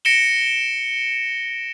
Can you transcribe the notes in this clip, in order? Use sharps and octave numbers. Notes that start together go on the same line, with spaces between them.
A#6 C#7 D7 E7 G7